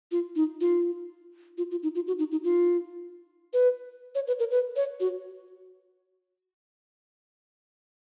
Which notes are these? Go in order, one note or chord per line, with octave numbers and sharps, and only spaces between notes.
F4
D#4
F4
F4
F4
D#4
F4
F#4
D#4
D#4
F4
B4
C#5
B4
A#4
B4
C#5
F#4